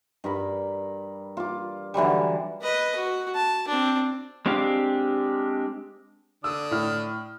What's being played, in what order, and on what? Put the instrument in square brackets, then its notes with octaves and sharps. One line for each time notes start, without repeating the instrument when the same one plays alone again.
[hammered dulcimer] G2 A#4 B5
F4 D6
D3 E3 F#3 G3
[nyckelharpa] B4 D#5
F#4
A5
C4 D4
[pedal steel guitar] G#3 C4 D4 G4 F5
[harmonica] D3 D4 D#6 [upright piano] E6
[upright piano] A2 F6